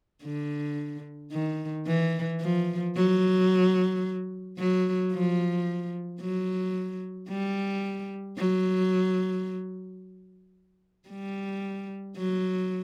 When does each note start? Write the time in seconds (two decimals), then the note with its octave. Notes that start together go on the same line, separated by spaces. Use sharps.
0.24 D3
1.32 D#3
1.87 E3
2.41 F3
2.96 F#3
4.58 F#3
5.13 F3
6.21 F#3
7.29 G3
8.38 F#3
11.09 G3
12.17 F#3